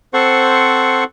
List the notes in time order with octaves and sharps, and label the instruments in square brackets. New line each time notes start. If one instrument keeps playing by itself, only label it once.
[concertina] C4 A4 C5 F#5 C#6